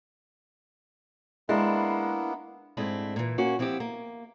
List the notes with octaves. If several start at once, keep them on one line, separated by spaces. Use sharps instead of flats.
G#3 A#3 B3 D4 E4
G#2 G#3 A3 C4 D4 E4
A#2 E3
A#3 C#4 F#4
F3 C4 E4 F#4 G4
A#3